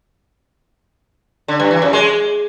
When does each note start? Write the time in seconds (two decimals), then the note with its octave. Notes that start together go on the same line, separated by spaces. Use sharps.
1.48 D3
1.60 G2
1.71 E3
1.82 F#2
1.93 G#3